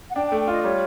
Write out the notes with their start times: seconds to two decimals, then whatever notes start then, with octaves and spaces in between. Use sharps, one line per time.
0.10 F#5
0.16 D4 G5
0.28 G5
0.32 A3
0.40 G5
0.48 F4 D#5
0.64 G3 C#5